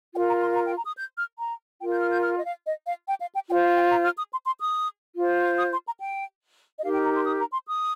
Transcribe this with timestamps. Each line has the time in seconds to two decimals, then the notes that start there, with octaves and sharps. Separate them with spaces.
0.13 F4 A#4 G5
0.27 A#5
0.42 C6
0.55 A#5
0.66 G5
0.76 A#5
0.87 D#6
0.96 G6
1.18 F6
1.39 A#5
1.81 F4 A#4 G5
1.91 G6
2.01 F6
2.12 G6
2.23 F6
2.36 D#5
2.44 F5
2.65 D#5
2.85 F5
3.07 G5
3.20 F5
3.34 G5
3.48 F4 C5 G5
3.63 F5
3.76 G5
3.90 A#5
4.04 F6
4.18 D#6
4.32 C6
4.46 C6
4.60 D#6
5.16 F4 C5
5.58 D#6
5.72 C6
5.86 A#5
5.99 G5
6.78 D#5
6.83 D#4 G4 A#4 F5
6.94 G5
7.04 A#5
7.15 C6
7.26 D#6
7.40 A#5
7.53 C6
7.67 D#6